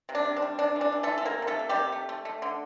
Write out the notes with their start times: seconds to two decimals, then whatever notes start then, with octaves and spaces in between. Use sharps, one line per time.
0.09 C3
0.15 D4
0.25 C3
0.36 D4
0.42 G3
0.59 C3 D4
0.76 E3
0.81 D4
0.92 E3
1.03 E3 A3 A4
1.18 A4
1.25 C3 A#3 A#4
1.42 C3
1.47 A3 A4
1.59 A#3
1.69 G3 G4
1.75 C3
1.92 A3
2.09 A3
2.25 A3
2.42 D3